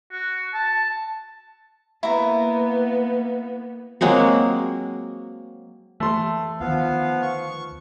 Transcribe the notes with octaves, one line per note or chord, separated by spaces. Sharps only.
F#4
A5
A#3 B3 E4 A#5
F#3 G#3 A#3 C4
E3 A3 C6
D2 D#3 F3 B3 F5
C#6